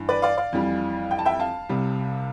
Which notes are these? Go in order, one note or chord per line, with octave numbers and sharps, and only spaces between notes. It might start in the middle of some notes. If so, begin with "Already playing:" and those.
Already playing: G2 E3
B4 D5
D5 F5
D5 F5
F2 E3 G3
G5
A5
E5 G5
F5 A5
C2 C3 G3